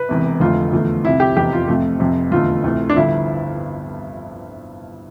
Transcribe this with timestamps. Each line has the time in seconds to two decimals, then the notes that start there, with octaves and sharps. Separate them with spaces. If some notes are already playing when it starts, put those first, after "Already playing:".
Already playing: B4
0.09 E1 E2 C3
0.40 F1 F2 D3 A3 F4
0.73 E2 D3 F3 A3
1.04 C2 C3 F3 E4
1.20 G4
1.37 F1 E2 C3 G4
1.53 F4
1.68 F2 C3 F3 A3
2.00 F1 F2 C3
2.31 F1 E2 D3 A3 F4
2.64 D2 C3 E3 A3
2.90 D4
2.96 G1 G2 D3 F3 E4